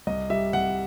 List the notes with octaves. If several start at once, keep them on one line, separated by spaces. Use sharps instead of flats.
C2 D#5
G3 E5
C2 F#5